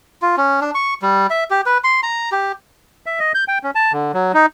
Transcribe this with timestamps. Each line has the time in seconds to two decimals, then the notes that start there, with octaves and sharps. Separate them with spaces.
0.22 F4
0.37 C#4
0.61 D4
0.75 C#6
1.02 G3
1.30 E5
1.50 G4
1.66 B4
1.84 C6
2.03 A#5
2.32 G4
3.06 E5
3.20 D#5
3.35 G6
3.48 G5
3.64 C#4
3.75 A5
3.92 D3
4.14 F#3
4.34 D#4